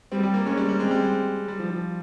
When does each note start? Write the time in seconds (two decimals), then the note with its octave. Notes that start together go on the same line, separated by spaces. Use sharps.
0.12 G3 C4
0.23 G3
0.34 A#3
0.46 G#3 C#4
0.57 G3
0.69 G3
0.80 G#3 C4
0.91 G3
1.01 G#3
1.48 G3
1.60 F3
1.70 F3